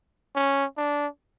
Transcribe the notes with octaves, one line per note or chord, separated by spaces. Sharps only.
C#4
D4